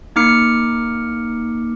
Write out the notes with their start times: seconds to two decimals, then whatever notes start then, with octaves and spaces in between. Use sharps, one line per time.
0.16 A#3 D#4 D6 F6 C#7